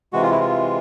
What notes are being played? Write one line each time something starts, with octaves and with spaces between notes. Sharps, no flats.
C3 E3 G#3 F#4
F4
E4
F4